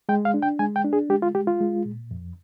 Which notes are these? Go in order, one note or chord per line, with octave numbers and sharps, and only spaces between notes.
G#3 G5
F5
D4
G5
G#3 G#5
G5
D4
G#4
G#3 G4
F4
G#3 G4
F4
G#3
A#2
F2